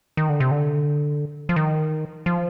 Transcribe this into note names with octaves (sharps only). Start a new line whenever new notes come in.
D#3
D3
C3
D3
F3
D#3
F3